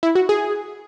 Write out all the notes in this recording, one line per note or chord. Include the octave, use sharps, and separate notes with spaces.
E4
F#4
G#4